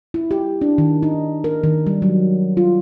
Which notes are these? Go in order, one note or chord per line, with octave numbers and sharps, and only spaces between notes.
E4
G4
D4
D#3
D#4
A#4
D#3
G3
F#3
F4